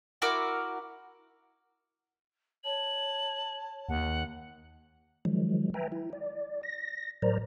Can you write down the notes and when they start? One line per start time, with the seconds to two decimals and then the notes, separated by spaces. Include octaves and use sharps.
0.22 E4 F#4 A#4 D6
2.64 C#5 A5 F#7
3.89 D#2 F#5
5.25 D#3 F3 F#3 G#3
5.74 B4 E5 G5 G#5 A#5
5.92 E4
6.13 D5
6.63 A#6
7.22 A2 F#3 A#4 C5 D5 A#5